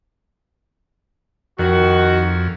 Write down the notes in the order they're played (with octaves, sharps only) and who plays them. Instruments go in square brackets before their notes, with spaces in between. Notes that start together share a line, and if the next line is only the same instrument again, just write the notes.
[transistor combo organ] F2 [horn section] D#3 F#4